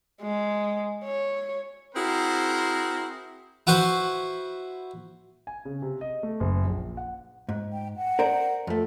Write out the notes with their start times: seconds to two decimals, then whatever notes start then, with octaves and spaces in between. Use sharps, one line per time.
0.21 G#3
1.04 C#5
1.95 C4 E4 F#4 G#4 A#4 C5
3.67 E4 F#4 B4 C5
5.47 G#5
5.65 C#3
5.82 C3
6.01 D#5
6.23 A3
6.40 F#1
6.64 A#1
6.97 F#5
7.49 G#2
7.73 G5
7.97 F#5
8.19 A#4 C5 D5
8.67 F2 A3